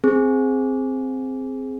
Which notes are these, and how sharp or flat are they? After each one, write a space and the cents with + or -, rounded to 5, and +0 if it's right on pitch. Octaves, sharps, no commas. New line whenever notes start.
C4 +0 G#4 +5